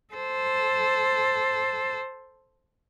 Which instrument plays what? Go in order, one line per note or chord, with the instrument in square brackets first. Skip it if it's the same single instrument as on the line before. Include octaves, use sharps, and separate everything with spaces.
[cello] A4 C5